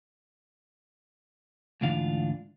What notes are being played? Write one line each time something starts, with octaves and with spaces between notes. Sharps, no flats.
D2 G#2 E3 D4 F4 F5